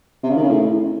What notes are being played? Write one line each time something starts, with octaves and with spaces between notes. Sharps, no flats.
C3
C#3
D#3
C#3
A2